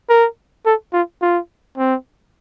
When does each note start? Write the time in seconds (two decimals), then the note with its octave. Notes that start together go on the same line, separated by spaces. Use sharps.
0.09 A#4
0.66 A4
0.93 F4
1.22 F4
1.78 C4